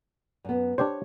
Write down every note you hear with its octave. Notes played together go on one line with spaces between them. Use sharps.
F#2 B3
D4 G4 C5 C#5